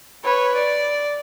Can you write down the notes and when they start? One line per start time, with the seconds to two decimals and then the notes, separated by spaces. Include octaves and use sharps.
0.24 B4 C#5
0.55 D5